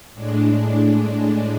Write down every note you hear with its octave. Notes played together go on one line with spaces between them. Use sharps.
A2 G#3 D4